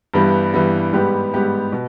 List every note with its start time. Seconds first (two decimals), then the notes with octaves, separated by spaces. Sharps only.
0.14 G2 E3 G3 B3
0.54 G2 E3 G3 B3
0.93 G#2 G3 B3 G4 B4
1.33 G#2 G3 B3 G4 B4
1.72 B2